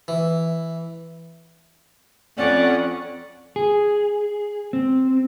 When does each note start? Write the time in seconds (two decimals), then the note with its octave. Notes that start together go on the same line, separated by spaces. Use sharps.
0.08 E3
2.38 F2 C#4 D5 F#5
3.56 G#4
4.73 C4